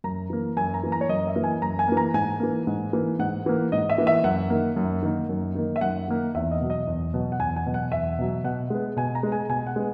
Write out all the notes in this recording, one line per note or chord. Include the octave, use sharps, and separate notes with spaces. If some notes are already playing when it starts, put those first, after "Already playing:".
F#2 A#5
E3 A#3
F#2 G#5
A#5
E3 A#3
A#5
C#5
F#2 D#5
E5
E3 A#3
G#5
F#2 A#5
G#5
E3 A#3
A#5
G#2 G#5
E3 A#3
G#2
E3 A#3
G#2 F#5
E3 A#3
G#2 D#5
E5
E3 A#3
E5
F#2 F#5
D#3 A#3
F#2
D#3 A#3
F#2
D#3 A#3
E5
F#2 F#5
D#3 A#3
E2 E5
D#5
B2 F#3
D#5
E2
B2 F#3
F#5
E2 G#5
G#5
B2 F#3
F#5
E2 E5
B2 F#3
B2 F#5
G#3 B3
B2 G#5
A#5
G#3 B3
G#5
B2 G#5
F#5
G#3 B3